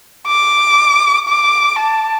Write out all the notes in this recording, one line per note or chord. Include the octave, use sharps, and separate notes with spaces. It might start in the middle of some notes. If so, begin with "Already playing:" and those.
D6
D6
A5